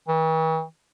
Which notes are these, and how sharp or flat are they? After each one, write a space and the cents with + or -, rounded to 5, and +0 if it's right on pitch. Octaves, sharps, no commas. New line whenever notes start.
E3 -45